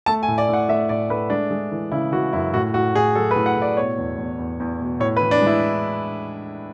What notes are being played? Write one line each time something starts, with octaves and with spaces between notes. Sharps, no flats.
A3 A5
G#5
A2
D5
A2 F#5
A3 E5
A2 D5
A3 B4
G#3 D4
G#3
E3
C#3 E4
E3 F#4
F#2 E4
A2 F#4
A2 F#4
A2 G#4
F#3 A4
B4
A2
F#5
A2
D5
B2 C#5
E2
E2
E2
E2
B2
A2 C#5
B4
E3
D4
G#3
E4